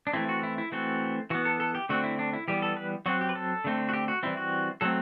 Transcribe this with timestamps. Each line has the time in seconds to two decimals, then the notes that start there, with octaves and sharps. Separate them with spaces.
0.07 D4
0.13 E3 A3 C4 E4
0.29 F#4
0.43 E4
0.58 E4
0.72 E3 A3 C4 F#4
1.30 E3 B3 F#4
1.45 A4
1.60 A4
1.75 G4
1.89 D3 A3 C4 F#4
2.04 E4
2.19 D4
2.33 E4
2.48 E3 G3 B3 G4
2.62 A4
2.77 B4
3.06 F#3 C4 F#4
3.21 G4
3.29 B4
3.35 A4
3.64 D3 A3 C4
3.89 F#4
3.93 G4
4.08 F#4
4.23 E3 G3 C4 E4
4.37 F#4
4.81 F#3 A3 C4 A4